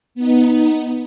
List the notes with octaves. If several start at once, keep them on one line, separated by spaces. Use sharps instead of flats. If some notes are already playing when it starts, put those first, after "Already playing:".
B3 D#4